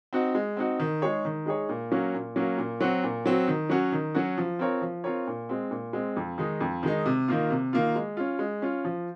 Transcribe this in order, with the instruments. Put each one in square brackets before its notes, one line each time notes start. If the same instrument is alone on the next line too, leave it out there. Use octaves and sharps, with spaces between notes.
[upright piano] C4 D#4 F#4
G#3
C4 D#4 F#4
D#3
G#3 D#4 G#4 C#5
D#3
G#3 D#4 G#4 C#5
A#2
F#3 A#3 C#4
A#2
F#3 A#3 C#4
A#2
F#3 C4 F#4
A#2
F#3 C4 F#4
D#3
F#3 C#4 F#4
D#3
F#3 C#4 F#4
F3
C4 F4 A#4 C#5
F3
C4 F4 A#4 C#5
A#2
G#3 C4
A#2
G#3 C4
F2
D#3 G#3 D#4
F2
D#3 G#3 D#4
C3
D#3 A#3 F4
C3
D#3 A#3 F4
G#3
C#4 F4
G#3
C#4 F4
F3